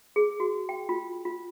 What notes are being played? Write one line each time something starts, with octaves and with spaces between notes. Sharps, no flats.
G#4
F#4
G5
F4
F4